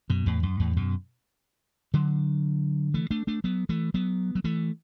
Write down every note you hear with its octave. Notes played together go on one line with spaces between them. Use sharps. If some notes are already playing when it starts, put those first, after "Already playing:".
F#2 B2
E2 A2
F#2
E2 A2
F#2 B2
D3 F#3
E3 A3
A3 D4
A3 D4
F#3 B3
E3 A3
F#3 B3
F#3
E3 A3